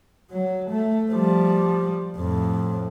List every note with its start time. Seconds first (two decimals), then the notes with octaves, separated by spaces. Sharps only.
0.31 F#3
0.70 A3
1.12 F3 G3
2.16 F2 A2